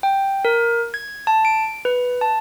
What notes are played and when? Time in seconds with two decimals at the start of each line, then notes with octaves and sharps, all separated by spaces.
0.03 G5
0.45 A#4
0.94 G#6
1.27 A5
1.45 D7
1.85 B4
2.21 A5